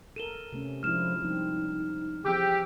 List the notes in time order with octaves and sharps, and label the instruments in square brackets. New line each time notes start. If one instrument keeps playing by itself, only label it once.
[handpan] A4 A#4 [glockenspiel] D#7 E7 G7
[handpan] C3 A3 C#4
[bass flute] F3 [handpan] G#3 D4 E4 [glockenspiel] F6 E7
[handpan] F3 G3 C4 [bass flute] D#4
[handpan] E3 F3 C4 [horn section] G4 [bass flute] G#4 [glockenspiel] D6 E6